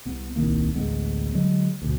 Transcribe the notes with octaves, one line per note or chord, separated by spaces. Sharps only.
C2 B3
D#1 C2 D#3 A#3
A1 D2 G#3 B3
D3 F#3 G#3
D2 B2